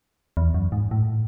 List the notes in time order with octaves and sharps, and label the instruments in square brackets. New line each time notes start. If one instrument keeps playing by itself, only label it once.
[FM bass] E2
F#2
G#2
A2